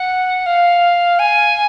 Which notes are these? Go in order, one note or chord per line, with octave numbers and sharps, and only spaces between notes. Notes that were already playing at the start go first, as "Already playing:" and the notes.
Already playing: F#5
F5
G#5